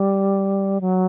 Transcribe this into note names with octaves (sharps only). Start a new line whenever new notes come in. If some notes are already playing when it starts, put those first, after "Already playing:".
Already playing: G3
F#3